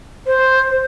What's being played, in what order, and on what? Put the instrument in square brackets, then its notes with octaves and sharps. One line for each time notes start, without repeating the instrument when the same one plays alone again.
[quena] C5